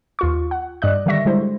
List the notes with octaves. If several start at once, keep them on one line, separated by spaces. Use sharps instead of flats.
D#2 F4 C#6
F#5
G2 D5 D#5 F#6
D3 D#3 G3 E5 C#6 A#6
D3 G3 G#3 E4 C5